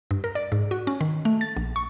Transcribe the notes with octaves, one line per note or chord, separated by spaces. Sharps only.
G2
A#4
D5
G#2
F#4
C#4
D#3
A3
A6
A#1
C#6